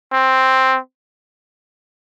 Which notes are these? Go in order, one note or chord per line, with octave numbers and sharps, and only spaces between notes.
C4